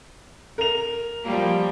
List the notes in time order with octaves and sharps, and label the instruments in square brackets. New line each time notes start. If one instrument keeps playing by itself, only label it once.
[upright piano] A#4 F7
[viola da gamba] F3 G3 A#3